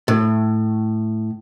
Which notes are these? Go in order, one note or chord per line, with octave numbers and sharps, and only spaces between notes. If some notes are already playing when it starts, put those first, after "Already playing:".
A2